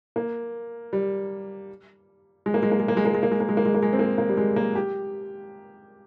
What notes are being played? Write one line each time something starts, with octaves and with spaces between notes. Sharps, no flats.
A#3
G3
G#3
A#3
G#3
A#3
G#3
A#3
G#3
A#3
G#3
A#3
G#3
A#3
G#3
A#3
G#3
A#3
G#3
C4
A#3
A#3
G3
G#3
A#3
G4